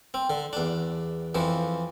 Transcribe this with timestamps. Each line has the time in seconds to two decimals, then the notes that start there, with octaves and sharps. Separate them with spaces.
0.14 C4
0.30 D3
0.53 E2 D4
1.35 F2 E3 F3